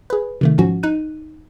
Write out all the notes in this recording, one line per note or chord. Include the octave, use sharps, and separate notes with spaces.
G#4 B4
C3 D#3 A3
G#2 F3 C#4 F#4
D#4 F#6 D#7